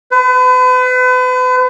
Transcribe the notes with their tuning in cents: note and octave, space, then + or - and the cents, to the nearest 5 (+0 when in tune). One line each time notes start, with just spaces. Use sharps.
B4 +40